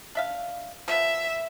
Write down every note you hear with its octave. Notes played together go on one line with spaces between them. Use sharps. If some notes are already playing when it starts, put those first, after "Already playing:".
D4 E5 F5
F3 B3 E5